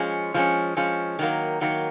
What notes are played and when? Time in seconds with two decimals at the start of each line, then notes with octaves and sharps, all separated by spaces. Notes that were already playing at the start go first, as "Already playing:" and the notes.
Already playing: F3 G#3 C#4
0.34 F3 G#3 C#4
0.77 F3 G#3 C#4
1.19 D#3 F#3 A#3
1.61 D#3 F#3 A#3